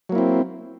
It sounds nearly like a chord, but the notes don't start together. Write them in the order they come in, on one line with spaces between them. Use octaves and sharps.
F#3 A#3 E4 C4